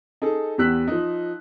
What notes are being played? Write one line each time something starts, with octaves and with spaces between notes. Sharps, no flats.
D#4 G#4 A4
E2 B3 G4 E6 F#6 B6
F3 D#4